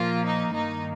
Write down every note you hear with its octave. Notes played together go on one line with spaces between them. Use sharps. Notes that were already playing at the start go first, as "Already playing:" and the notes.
Already playing: A#2 F3 A#3 F4
D#4
G2 D#3 A#3 D#4